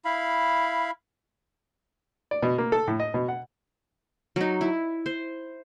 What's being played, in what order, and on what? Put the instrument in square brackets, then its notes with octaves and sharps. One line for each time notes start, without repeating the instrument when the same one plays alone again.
[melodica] E4 F5 B5
[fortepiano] D5
B2
A#3
A4
A2
D#5
B2
F#5
[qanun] F#3 D#4
E4
C5